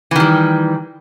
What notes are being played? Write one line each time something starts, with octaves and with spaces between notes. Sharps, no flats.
D#3 E3 G3